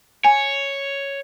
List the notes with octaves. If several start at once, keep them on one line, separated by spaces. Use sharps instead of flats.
C#5 G#5